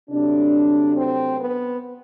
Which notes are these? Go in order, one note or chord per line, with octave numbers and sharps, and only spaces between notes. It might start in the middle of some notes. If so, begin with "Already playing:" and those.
C3 F#3 A3 D4
C4
B3